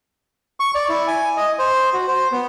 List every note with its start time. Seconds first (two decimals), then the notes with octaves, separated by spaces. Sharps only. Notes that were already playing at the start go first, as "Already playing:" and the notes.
0.60 C#6
0.75 D5
0.89 E4
1.07 G#5
1.37 D#5
1.59 C5
1.93 F#4
2.08 C5
2.32 B3